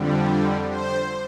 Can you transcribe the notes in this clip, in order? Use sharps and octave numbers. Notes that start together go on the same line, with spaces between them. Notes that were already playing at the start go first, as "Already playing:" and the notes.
Already playing: F2 D3 G3
C5